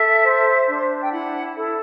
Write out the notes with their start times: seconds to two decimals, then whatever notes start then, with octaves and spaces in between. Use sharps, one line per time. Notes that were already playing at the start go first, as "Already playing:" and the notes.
Already playing: A4 E5
0.23 C5
0.68 D4
1.02 G5
1.12 E4 F#5
1.57 A4